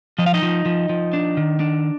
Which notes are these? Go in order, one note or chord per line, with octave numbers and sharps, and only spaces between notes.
F3 D#5
F5
D#4 D#5
F3
F3
F3
D4
D#3
D4